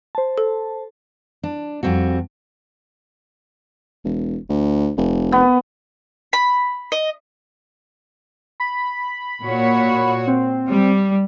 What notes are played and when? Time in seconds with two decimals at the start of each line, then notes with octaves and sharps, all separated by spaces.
0.15 C5 A5
0.38 A4
1.43 D4
1.83 F2 G3 C4 F#4
4.04 E1
4.49 D2
4.97 F1
5.32 B3
6.33 B5
6.92 D#5
8.60 B5
9.41 A#2 F#4 C#5
10.27 C4
10.68 G3